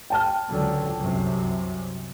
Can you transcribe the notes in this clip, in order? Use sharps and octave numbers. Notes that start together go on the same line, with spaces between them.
G5 A5 F6
C#2 D3 F#3
C2 F#2 C3